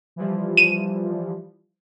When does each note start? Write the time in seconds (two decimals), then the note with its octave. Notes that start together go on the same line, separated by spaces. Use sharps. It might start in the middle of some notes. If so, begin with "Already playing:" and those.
0.16 E3 F3 G3
0.57 D#7 E7